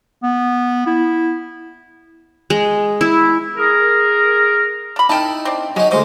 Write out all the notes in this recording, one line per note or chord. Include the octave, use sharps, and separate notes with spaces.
B3
E4
G#3
E4
G#4 A#4
D4 B5
D#4 E4 A#4 G5 A5
C4 D4
F#3 G#3 D#4 D#5
D2 F3 G#3 F#4 C5 D#5 D6